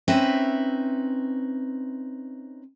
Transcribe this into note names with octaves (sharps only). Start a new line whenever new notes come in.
C4 C#4 D#4 B4 E5